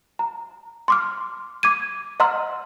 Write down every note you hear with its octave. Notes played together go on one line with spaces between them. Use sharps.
A#5
C6 D6 F6
D6 G#6 D#7
D#5 F#5 A#5 C6 E6 F6